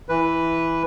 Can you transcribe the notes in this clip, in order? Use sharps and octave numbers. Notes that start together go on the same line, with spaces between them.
E3 B4